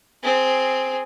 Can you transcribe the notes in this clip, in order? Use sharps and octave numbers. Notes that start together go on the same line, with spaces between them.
C4 G#4